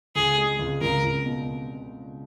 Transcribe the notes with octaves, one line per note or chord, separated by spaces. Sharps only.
C#2 G#4
G#3
C#2
C#2 A#4
C#2
B2